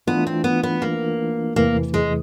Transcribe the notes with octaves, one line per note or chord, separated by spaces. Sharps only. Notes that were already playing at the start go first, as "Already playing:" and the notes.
E3 A3 B3 D4 F4
C4
B3
B3
A#3
E2 C3 E3 A3 A#3
G#3